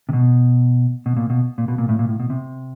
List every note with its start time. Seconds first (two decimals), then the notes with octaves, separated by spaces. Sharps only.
0.09 C3
0.13 B2
1.06 B2
1.17 A#2
1.30 B2
1.58 A#2
1.68 B2
1.78 A#2
1.89 A2
1.99 A#2
2.09 A2
2.20 B2
2.30 C3